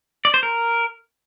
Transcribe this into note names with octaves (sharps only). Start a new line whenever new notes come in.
D5
C5
A#4